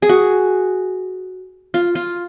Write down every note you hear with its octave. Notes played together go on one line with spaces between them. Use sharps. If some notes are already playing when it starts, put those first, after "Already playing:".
G#4
F#4
F4
F4